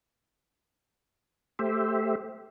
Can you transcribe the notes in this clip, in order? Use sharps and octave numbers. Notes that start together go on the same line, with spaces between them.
A3 G4 C5 E5